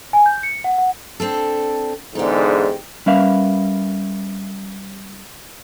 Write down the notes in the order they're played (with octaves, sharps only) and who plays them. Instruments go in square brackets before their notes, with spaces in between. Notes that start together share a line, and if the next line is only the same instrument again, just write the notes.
[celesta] G#5
G6
C#7
F#5
F#5
[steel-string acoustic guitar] C4 D4 A4
[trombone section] E2 G#2 D3 [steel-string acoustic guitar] D#4 G4
[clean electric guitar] G3 C#4 A#4 B4 E5 F5